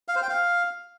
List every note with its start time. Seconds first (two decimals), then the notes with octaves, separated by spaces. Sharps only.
0.08 F5
0.15 C5
0.22 G5
0.30 F5